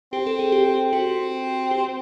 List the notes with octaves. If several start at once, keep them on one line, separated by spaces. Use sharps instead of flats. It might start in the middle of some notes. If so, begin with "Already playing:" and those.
C4 G4
A4
G#4
G4
C4 F#4
G4